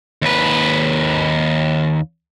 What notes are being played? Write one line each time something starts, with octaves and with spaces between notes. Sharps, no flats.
D#2 B4